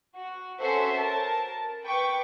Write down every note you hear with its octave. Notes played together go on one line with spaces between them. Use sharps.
F#4
C#4 F#4 A4 C5 E5 F#5
A#4 A5
B4 G5 C#6 D6